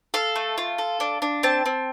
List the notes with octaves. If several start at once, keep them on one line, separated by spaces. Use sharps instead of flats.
A4 F5
A3
F4
A4
D4
D4
C4 A5
C4